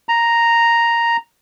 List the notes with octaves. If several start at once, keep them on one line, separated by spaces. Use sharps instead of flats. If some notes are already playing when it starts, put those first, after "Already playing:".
A#5